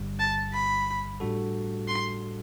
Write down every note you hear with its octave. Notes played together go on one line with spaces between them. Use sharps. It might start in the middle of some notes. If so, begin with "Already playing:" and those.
Already playing: G1 G2 D3 G3
A5
B5
A2 G3 D4 F#4 A4
C6